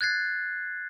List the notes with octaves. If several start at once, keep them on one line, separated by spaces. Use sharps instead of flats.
F#6 G#6 A6 C7